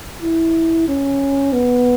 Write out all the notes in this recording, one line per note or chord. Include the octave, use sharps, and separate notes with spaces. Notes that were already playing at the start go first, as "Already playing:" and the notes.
E4
C#4
B3